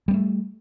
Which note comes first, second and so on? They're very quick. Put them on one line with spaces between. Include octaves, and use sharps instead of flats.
G3 B3 A3